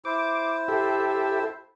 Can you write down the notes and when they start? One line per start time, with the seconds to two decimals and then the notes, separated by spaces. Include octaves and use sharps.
0.05 E4 C5 D6
0.68 G4 A4 E5